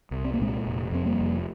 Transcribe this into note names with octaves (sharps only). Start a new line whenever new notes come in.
C2
C4
A#3
A#2 G#3 C4
F1
F2 C4
G3 A#3
F1